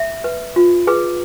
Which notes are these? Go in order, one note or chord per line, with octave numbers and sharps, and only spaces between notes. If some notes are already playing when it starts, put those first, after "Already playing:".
Already playing: E5
B4
F4
G#4 B4